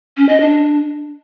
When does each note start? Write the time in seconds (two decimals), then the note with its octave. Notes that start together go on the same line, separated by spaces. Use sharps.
0.17 C#4
0.29 D#5
0.40 D4